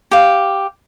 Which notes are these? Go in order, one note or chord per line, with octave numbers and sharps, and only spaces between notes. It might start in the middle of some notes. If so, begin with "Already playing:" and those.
G4 F5